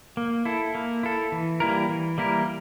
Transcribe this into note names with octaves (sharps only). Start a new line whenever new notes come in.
A#3
E4 A4
A#3
E4 A4
E3
G3 A#3 E4 A#4
E3
G3 A#3 E4 A#4